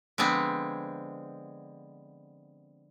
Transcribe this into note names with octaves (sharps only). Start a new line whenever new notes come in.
D3 F3 G#3 B3 C4